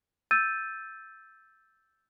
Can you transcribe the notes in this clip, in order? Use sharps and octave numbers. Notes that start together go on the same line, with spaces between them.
E6 G6 A6 D#7